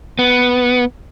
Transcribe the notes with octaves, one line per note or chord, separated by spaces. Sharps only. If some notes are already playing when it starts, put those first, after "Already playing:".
B3